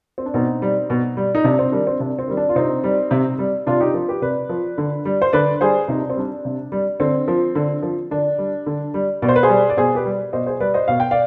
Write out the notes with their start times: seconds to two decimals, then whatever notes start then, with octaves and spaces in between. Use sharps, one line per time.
0.18 C4
0.26 D4
0.34 B2 C4 D#4
0.62 G3
0.90 B2
1.17 G3
1.35 D#4
1.44 C3 D4
1.59 C4
1.72 D#3 G3 D4
1.87 C4
2.00 C3 D4
2.19 C4
2.28 D#3 G3
2.37 D4
2.49 F4
2.55 C3 C4 D#4
2.84 G3
3.11 C3
3.39 G3
3.67 C3 D4 F4
3.80 D#4 G4
3.94 F3
4.08 G4 B4
4.22 C3 B4 D5
4.49 F3
4.78 D3
5.05 G3
5.22 C5
5.33 D3 B4 D5
5.61 G3 G#4 C5
5.88 C3 D#4
5.99 D4
6.10 C4
6.16 G3 D4
6.45 C3
6.72 G3
7.00 D3 C4
7.28 F3
7.55 D3
7.82 F3
8.11 D3 D4
8.38 G3
8.66 D3
8.94 G3
9.22 B2 D5
9.28 C5
9.36 B4
9.43 G#4 C5
9.49 G3
9.70 D5
9.77 B2 G#4 C5
9.95 G4 B4
10.05 G3
10.33 B2 C5 D#5
10.46 G#4 C5
10.60 G3 B4 D5
10.74 C5 D#5
10.88 B2 F5
11.00 G5
11.11 D5 F5